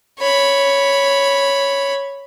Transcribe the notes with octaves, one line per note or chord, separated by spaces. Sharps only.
C#5 B5